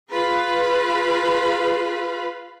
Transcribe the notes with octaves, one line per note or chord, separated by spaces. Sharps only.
F4 G#4 B4 F5 B5